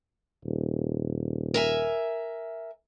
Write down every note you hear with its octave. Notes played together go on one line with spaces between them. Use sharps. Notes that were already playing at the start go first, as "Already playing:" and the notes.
D#1
A#4 E5 G#5